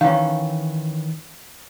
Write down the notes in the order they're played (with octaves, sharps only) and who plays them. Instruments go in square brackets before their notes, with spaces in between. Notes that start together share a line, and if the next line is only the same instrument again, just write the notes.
[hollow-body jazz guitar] D#3 E3 C#4 [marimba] F5